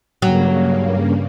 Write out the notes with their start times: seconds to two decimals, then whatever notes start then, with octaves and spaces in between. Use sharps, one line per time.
0.22 G2 C#3 F#3 A#3